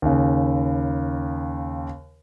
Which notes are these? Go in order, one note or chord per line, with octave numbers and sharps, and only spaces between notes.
D#2 C#3